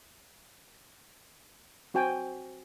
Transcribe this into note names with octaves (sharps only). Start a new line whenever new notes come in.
C4 F#4 C5 G5 G#5